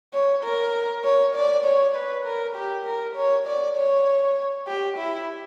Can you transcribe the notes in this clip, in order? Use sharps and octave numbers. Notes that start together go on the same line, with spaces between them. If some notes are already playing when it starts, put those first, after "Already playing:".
C#5
A#4
C#5
D5
C#5
B4
A#4
G4
A#4
C#5
D5
C#5
G4
E4